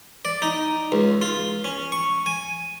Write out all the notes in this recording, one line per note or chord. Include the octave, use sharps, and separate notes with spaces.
D5
D#4
C#2
F4
C#4
C#6
G#5